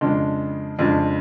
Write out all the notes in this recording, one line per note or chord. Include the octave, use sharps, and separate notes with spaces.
F2 C#3 G#3 D4
F2 C#3 G#3 D4